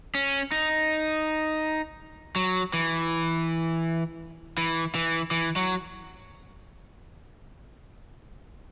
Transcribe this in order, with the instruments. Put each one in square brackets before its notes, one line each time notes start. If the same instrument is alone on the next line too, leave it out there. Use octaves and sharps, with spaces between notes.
[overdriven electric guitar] C#4
D#4
F#3
E3
E3
E3
E3
F#3